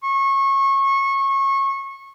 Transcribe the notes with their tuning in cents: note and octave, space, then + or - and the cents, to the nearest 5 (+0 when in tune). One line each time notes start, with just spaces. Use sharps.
C#6 -25